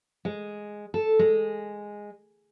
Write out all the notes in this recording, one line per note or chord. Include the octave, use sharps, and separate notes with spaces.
G#3
A4
G#3